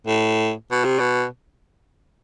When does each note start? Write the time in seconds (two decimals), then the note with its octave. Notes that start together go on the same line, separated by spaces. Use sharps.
0.07 A2
0.71 B2
0.85 C3
0.99 B2